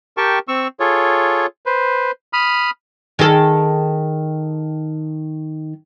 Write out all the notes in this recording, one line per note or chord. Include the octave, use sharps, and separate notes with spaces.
G4 A#4 G5 A5 C#6
C4 C#6 E6
F4 G#4 A4 C#5
B4 C5
B5 D#6 F6
D#3 G#4 A4